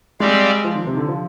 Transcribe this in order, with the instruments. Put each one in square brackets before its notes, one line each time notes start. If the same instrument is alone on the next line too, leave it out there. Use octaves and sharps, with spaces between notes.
[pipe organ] G3 C4 G4 D5 F5 [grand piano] G#3
[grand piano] F3
D#3
C3
D3
F3